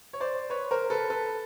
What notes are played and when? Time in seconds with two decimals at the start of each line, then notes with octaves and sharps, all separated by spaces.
0.13 C#5
0.21 C5 D5
0.50 B4 C#5
0.71 A#4 C5
0.90 A4 B4
1.10 A4 B4